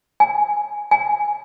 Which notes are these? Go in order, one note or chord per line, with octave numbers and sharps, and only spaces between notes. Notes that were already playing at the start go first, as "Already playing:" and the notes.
G#5
G#5